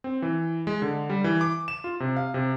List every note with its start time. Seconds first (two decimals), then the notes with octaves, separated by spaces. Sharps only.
0.04 C4
0.22 E3
0.67 G#3
0.82 D3
1.10 G3
1.24 E3
1.41 D6
1.68 E7
1.84 F4
2.00 C3
2.17 F5
2.34 C3